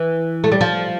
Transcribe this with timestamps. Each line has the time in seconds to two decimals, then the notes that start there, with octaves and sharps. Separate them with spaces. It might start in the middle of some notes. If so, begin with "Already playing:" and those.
Already playing: E3
0.44 A3
0.52 G3
0.61 F3